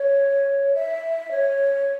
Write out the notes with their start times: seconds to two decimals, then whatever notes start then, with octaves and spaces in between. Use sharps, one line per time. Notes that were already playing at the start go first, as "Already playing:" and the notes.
Already playing: C#5
0.75 E5
1.31 C#5